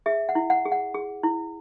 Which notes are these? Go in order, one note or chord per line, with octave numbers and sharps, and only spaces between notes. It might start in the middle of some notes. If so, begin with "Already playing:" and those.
G#4 E5
F#5
E4
F#5
G#4
F#5
G#4
E4